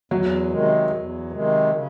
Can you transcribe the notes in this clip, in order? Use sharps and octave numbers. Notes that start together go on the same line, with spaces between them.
E2 F#3
C3 D#3 G#3
E2
C3 D#3 G#3
C#3